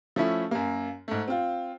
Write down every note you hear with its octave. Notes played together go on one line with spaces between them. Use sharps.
F3 A3 C#4 E4
F#2 A#3
G#2 A3
C4 F4